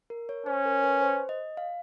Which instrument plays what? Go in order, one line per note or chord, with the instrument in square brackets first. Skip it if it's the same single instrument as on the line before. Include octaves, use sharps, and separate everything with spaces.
[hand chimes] A#4
C#5
[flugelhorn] C#4 [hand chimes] C5
[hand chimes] A#4
B4
C5
D#5
F5